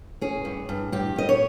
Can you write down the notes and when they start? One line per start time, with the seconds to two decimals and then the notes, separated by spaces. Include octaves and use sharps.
0.21 C#4 G#4
0.45 G2
0.69 G2
0.92 G2 G4
1.16 G2 D#5
1.29 C#5